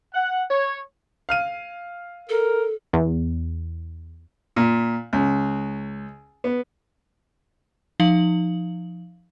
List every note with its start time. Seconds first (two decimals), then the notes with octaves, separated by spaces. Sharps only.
0.14 F#5
0.50 C#5
1.29 F5 F6 D#7
2.29 A4 A#4
2.93 E2
4.56 A#2
5.13 C#2
6.44 B3
8.00 F3 D#4 F5 F#7